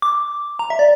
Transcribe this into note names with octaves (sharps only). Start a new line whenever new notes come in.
D6
A#5
E5
D5